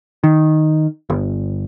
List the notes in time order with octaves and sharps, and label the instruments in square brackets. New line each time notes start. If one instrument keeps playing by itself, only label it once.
[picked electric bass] D#3
G1